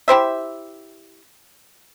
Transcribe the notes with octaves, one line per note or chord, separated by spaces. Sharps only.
E4 G4 C5 E5